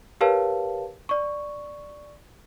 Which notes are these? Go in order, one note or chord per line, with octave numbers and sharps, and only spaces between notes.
G4 A#4 B4 C#5 F5 A5
D5 C#6